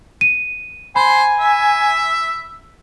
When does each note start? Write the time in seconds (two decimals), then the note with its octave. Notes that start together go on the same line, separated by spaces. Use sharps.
0.21 D#7
0.96 C5 G#5 B5
1.40 E5